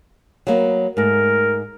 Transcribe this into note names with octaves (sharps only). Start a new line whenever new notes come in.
F#3 A#3 B3
G#2 A3 A#4